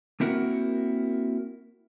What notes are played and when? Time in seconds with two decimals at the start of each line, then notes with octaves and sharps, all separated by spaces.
0.20 A#3 C4 E4 F#4 A#4 F#5